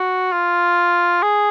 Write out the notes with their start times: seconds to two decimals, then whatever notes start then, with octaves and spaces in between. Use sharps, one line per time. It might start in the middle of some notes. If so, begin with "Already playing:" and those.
Already playing: F#4
0.32 F4
1.23 G#4